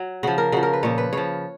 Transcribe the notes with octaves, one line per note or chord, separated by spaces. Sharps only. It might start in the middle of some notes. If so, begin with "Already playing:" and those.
Already playing: F#3
C#3 F3 F#4
A#4
C#3 F3 F#4
A#4
B4
A#2 F3 C#5
B4
C#3 F3 C#5